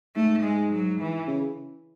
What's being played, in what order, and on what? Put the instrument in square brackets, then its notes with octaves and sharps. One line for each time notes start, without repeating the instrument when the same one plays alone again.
[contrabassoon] G#2 [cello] A3
[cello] G#3
F#3
E3
[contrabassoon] C#3